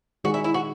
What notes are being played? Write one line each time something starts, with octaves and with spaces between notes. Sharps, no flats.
D#3 G#3 D#4 F#4 G#4
E4
E4
F#4